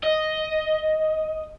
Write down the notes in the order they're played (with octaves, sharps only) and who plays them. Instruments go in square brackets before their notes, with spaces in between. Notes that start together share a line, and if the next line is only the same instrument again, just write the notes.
[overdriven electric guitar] D#5